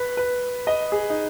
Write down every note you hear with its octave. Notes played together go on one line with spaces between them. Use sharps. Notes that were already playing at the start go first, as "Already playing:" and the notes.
Already playing: B4
B4
D#5
G#4
D#4